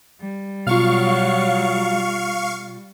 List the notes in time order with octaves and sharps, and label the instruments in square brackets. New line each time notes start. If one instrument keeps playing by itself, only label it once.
[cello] G3
[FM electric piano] B2 F4 [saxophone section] F#3 [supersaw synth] F5 C#6